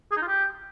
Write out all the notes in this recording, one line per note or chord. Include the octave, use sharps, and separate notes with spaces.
G#4
D#4
F4
G4